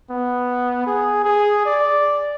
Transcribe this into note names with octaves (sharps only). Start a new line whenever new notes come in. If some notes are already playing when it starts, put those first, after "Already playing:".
B3
G#4
G#4
D5